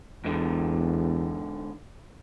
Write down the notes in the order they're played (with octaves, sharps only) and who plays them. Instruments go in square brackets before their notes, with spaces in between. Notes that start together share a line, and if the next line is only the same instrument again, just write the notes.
[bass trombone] E2 [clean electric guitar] G#2 D3